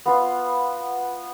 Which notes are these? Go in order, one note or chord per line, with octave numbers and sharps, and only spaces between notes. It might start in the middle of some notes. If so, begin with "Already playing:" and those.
B3 F4